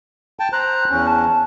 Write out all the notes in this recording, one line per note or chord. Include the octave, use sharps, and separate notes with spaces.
G5 A5
C5 A#5 F#6
E2 C#4
A5